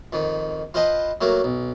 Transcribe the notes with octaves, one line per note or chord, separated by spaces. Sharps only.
F2 D#3
F4 B4 C5 D#5 G5 A5
F#3 A3 A#3 A#4
B1